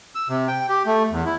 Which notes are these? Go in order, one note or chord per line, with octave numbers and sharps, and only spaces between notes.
E6
C3
G5
G4
A3
E2
E4